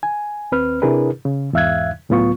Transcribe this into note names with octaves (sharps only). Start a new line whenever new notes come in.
G#5
D#2 C4 B4 F6
C3 D4 E4 G#4 A#4 B4
C#3
E2 G#2 E5 F5 F#6 G#6
C#2 A2 F#3 B3 F4 C#6